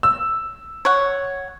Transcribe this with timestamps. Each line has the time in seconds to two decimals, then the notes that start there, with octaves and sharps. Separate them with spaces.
0.03 E6
0.85 C#5 F#5